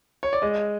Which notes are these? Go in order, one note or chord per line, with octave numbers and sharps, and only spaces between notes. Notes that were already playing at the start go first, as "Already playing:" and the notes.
C#5
D5
G#3 D#5